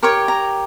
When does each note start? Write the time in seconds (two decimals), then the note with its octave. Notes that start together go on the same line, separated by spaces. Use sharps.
0.03 G4 A#4 C#5 C#6
0.28 A#5